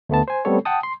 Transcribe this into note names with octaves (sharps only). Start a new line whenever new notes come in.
D2 A3 B3 A5
C5 G#5
G3 A3 B3 C4 A4 C#5
F#5 G5 A5 D#6
C6